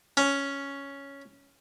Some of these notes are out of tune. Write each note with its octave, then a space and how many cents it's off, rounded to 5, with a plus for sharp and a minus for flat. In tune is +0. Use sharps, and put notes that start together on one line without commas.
C#4 +5